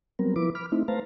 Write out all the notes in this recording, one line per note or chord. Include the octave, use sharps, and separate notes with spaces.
F#3 G3 B3 C4 A#4
F3 E4 B4 D6
B5 D6 F6
A3 C4 D#4 E4
A3 B4 C5 F5 A5 A#5